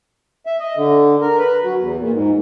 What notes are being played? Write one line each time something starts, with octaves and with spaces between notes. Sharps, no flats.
E5
D#5
D3
A#4
B4
F#3
E2
A#2
G#2